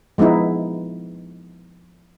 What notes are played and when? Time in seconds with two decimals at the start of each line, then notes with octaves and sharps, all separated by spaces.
0.18 F3 G#3 B3 D#4 E4